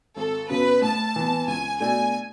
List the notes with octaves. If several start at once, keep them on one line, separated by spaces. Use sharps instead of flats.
G#1 A4
F#2 C#3 F#3 B3 B4
A2 A5
E3 B3
C#2 G#5
B2 A3 D4 G#5